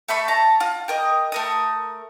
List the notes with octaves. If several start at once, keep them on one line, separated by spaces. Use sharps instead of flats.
A3 E5 B5 C#6
A5 A#5
F4
G4 A#4 D#5
A3 A#4 D#6